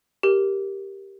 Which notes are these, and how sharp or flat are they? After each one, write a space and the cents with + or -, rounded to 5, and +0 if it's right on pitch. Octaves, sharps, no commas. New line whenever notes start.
G4 +0 A#4 +0